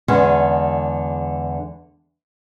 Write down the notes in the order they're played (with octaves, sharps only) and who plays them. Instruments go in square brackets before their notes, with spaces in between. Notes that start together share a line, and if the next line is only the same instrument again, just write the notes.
[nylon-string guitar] E2 D3 G#3 C#4